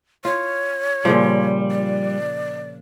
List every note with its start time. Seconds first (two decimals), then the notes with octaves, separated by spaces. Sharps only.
0.25 F4 C#5
1.05 A#2 C#3 F3 G3
1.71 D5